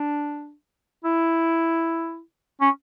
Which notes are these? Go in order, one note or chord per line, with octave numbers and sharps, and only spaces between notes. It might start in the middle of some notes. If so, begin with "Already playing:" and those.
Already playing: D4
E4
C#4